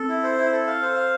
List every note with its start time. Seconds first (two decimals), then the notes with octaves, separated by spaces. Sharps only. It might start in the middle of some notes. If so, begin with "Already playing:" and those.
Already playing: C4 A4
0.08 E4
0.23 C5
0.38 E4
0.52 A4
0.67 F5
0.82 C5
0.96 F5